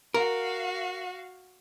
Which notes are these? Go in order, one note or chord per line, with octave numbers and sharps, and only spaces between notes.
F#4 A#4 F5